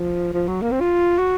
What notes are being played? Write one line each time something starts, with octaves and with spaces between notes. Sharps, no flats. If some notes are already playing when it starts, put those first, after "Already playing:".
Already playing: F3
F3
F#3
A#3
C4
F4
F#4